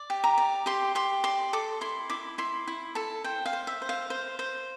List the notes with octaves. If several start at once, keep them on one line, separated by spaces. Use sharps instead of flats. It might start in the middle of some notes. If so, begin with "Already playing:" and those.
Already playing: D5
G4
A#5
D5
G4 C6
G4 C6
D5 C6
A4 D6
E4 C6
E4 D6
E4 C6
E4
A4 A5
C5 G5
F5
C5
E5
C5
F5
C5
C5